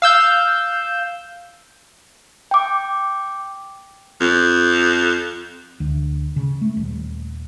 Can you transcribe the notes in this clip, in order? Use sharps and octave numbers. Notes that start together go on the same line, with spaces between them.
F5 E6 G6
G5 D6
F2
D2
C#3
A3
D#1